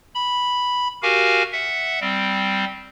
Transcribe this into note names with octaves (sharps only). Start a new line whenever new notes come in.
B5
F#4 G4 A#4 F5 G#5
E5 F#5
G3 C4